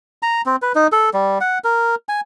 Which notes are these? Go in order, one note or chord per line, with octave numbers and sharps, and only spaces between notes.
A#5
C4
B4
D#4
A4
G3
F#5
A#4
G#5